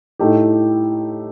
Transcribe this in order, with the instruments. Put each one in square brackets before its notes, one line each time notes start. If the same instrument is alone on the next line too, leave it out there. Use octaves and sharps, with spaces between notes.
[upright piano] A2 A3 D#4 G4